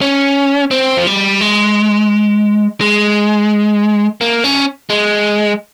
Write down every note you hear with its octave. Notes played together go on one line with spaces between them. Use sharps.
C#4
C4
F3
G3
G#3
G#3
A#3
C#4
G#3